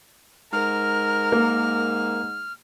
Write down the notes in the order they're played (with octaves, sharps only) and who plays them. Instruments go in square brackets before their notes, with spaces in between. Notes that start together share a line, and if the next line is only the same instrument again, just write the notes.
[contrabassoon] G#2 [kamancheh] A#4 [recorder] F6
[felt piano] A#3